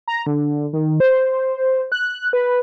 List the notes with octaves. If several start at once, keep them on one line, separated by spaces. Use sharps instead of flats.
A#5
D3
D#3
C5
F#6
B4